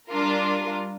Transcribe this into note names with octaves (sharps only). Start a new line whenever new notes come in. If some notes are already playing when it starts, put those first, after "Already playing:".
G3 D4 F4 A#4